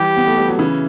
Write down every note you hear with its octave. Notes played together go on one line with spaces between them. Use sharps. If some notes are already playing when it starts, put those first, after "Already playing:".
Already playing: E3 G3 G4
B3
A3
G3
F#3
C#3 E3